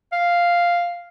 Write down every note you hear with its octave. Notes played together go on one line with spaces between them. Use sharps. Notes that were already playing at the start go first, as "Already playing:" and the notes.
F5